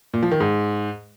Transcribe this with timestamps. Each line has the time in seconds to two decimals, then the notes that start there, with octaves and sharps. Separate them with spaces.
0.14 A#2
0.23 F3
0.31 D#3
0.40 G#2